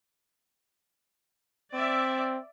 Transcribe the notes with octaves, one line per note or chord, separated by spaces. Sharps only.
C4 D5 E5